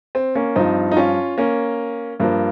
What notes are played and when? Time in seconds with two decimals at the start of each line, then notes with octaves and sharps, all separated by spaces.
0.15 C4
0.35 A#3 C#4
0.56 G2 F3 C4 D#4
0.92 D#4
0.97 C#4 F4
1.38 A#3 C#4
2.20 G2 F3 A#3